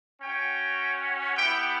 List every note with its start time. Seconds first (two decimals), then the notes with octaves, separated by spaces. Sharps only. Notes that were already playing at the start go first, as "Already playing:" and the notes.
0.21 C#4 F#4 G5
1.36 B3 E4 G4 G5